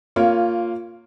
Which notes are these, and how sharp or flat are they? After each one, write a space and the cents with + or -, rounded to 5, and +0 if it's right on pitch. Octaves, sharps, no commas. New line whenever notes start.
A#3 -15 F4 +0 C#5 +0